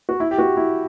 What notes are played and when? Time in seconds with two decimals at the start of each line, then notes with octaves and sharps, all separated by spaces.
0.09 F#4
0.20 E4
0.31 G4
0.39 F#4
0.57 E4